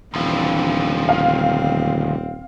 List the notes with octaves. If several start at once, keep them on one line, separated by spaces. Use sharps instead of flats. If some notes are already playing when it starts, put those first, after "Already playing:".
D#1 D2 E3 F3 C4 D4
C4 F5